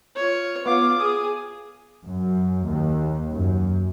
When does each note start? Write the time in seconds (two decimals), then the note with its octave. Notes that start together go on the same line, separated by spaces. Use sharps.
0.16 F4 C#5
0.66 B3 F4 F5 D6
1.00 G#4 D#6
2.05 F#2
2.66 D#2
3.32 F#2